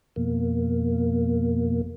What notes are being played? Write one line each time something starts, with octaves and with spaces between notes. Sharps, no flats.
F2 B2 A#3